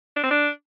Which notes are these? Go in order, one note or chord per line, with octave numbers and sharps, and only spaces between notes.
D4
C4
D4